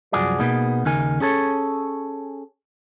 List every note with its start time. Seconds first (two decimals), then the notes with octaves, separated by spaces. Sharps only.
0.13 C2 F#2 F3 F#4 G#4 D5
0.39 B2 A#3 B3 D#4 G#4
0.85 D#2 C#3 D#4 A#4 G#5
1.20 C#4 G#4 A4 C#5